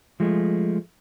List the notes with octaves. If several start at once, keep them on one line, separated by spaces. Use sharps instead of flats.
F3 G#3 A3